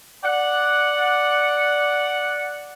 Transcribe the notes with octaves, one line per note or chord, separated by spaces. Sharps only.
D5 F#5